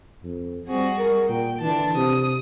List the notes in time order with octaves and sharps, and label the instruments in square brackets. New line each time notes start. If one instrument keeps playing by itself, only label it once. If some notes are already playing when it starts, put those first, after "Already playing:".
[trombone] F2
[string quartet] G3 F#4 G#4 [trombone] C4
[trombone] A#4
[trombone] A#2 [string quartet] G5
[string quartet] D3 D4 A5 [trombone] E3
[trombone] C3 [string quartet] D#6